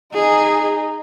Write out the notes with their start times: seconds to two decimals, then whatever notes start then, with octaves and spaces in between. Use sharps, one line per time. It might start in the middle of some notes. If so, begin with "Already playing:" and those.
0.14 D#4 G#4